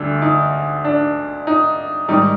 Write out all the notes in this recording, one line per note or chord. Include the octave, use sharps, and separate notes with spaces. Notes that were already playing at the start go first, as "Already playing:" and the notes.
Already playing: D2 D3 G3 D4
D#4
D4
D#4
G#2 D#3 G3 D#4